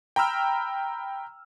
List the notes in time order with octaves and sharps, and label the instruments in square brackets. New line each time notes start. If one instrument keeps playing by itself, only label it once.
[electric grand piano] G5 A#5 B5 E6 F6